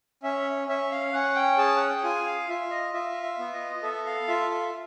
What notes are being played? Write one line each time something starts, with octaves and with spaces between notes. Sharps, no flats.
C#4 E5
C#4 E5
F5
C#4 F#5
G5
G#4 A5
F#5
G5
F4 G#5
F5
F4 E5
D#5
F4 E5
E5
B3
D#5
A4 E5
F5
F4 E5
E5